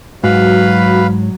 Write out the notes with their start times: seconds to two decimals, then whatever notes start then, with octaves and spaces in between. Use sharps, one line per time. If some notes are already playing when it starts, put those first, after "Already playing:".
0.24 G#2 F#3 F#4 B4 F5 B5